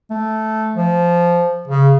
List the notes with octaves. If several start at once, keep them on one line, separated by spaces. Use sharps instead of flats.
A3
F3
C#3